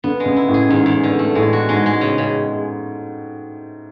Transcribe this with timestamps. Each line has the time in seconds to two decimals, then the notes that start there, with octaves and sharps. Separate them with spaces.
0.04 D3 B3
0.20 G#3
0.26 C#3
0.36 E4
0.48 A2
0.54 G#4
0.69 E2 G#2
0.86 E2
1.03 D3
1.19 A3
1.35 A2 G#3
1.53 F#4
1.69 G#2 G#3
1.86 G#3
2.01 C#3
2.18 C#3